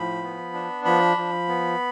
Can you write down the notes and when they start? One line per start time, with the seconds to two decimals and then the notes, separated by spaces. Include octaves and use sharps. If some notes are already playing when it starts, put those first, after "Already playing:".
Already playing: A2 F3 B5
0.22 B3
0.53 D4
0.85 F3 B5
1.17 F3
1.48 B3